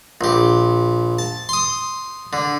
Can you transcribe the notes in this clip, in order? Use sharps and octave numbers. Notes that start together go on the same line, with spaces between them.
A#1 G4
A5
C6 D#6
D3